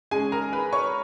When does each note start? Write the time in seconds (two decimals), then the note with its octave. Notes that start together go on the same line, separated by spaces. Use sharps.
0.11 C#3 G#3 C#4 G#4 G#5
0.32 A#4 A#5
0.53 B4 B5
0.73 C#5 C#6